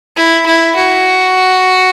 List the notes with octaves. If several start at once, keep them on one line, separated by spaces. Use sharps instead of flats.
E4
E4
F#4